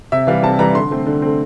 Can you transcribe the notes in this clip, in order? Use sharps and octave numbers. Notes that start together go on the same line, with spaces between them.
C3 E5
E3 G3 F5
C3 A5
E3 G3 A#5
D3 C6
A3 C4
D3
A3 C4